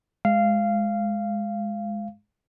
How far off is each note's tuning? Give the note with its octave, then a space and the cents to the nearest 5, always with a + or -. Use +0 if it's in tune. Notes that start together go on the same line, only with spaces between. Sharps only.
G#3 +5 F5 -15